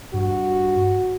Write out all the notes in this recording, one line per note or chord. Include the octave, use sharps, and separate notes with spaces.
G2 F#4